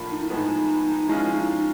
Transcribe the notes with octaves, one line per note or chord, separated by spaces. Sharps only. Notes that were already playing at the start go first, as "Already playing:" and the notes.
Already playing: A2 F3 A#3 D4 F4
D#4
E4
A2 F3 G#3 B3 D#4
F3 G#3 C#4 E4 F4
D#4